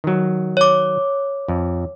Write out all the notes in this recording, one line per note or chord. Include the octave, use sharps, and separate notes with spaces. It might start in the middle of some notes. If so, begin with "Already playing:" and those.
D#3 F#3
C#5 D6
F2